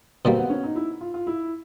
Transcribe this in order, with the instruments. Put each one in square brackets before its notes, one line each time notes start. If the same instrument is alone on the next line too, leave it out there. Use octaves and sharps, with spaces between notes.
[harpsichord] B2 G3 A#3 [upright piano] C4
[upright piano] B3
C#4
D#4
E4
F4
F4
E4